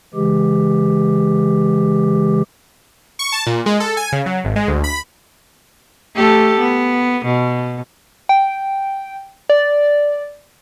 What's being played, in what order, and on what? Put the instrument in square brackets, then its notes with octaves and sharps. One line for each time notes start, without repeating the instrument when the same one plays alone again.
[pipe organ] C#3 E3 G#3 G4
[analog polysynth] C#6
A5
A#2
G#3
A4
G#5
C#3
F#3
G#1
G#3
D2
B5
[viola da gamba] A3 G4 A4
B3
B2
[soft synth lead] G5
D5